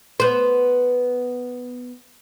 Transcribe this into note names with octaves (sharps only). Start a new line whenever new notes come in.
B3 C5